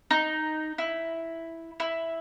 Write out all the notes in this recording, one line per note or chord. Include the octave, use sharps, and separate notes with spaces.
D#4
E4
E4